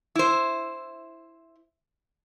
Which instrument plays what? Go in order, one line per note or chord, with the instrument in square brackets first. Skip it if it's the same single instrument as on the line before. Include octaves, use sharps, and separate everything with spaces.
[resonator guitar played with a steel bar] E4 C5